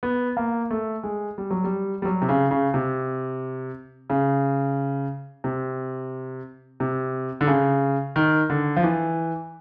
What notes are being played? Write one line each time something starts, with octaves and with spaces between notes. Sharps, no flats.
B3
A#3
A3
G#3
G3
F#3
G3
G3
F#3
C3
C#3
C#3
C3
C#3
C3
C3
D3
C#3
D#3
D3
F3
E3